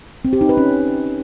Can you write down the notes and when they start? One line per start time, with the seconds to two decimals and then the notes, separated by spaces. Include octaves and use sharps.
0.25 C4
0.33 G4
0.41 D#4
0.49 B4
0.57 C#4